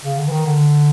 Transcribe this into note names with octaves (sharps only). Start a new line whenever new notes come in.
C#3
D3
E3
D#3
D3